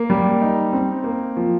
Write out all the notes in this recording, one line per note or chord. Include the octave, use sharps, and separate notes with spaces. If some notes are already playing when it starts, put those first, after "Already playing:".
Already playing: A#3
G3
D#4
C4
A#3
F3